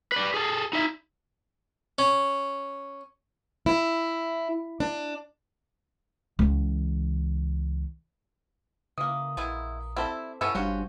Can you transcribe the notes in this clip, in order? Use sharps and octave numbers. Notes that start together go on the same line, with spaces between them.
B4 D5
G#4 A4
D#4 E4 E5
C#4
E4
D4
C#2 E3
C#3 E3 A#3 D#6
A#1 G#3 B3 E4
G3 C4 E4 A4 E5
G2 F3 F#3 B3 C#4 E4 A4 E6
G1 G3 D4 F4 F#4 C5